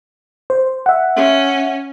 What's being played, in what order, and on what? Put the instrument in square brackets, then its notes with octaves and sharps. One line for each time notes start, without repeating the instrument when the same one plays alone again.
[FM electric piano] C5
E5 F#5
[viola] C#4